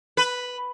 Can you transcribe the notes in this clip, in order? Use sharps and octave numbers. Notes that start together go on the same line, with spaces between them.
B4